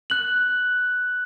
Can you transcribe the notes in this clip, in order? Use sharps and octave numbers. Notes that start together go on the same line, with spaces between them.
F#6 F#7